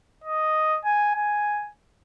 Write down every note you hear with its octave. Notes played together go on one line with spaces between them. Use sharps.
D#5
G#5
G#5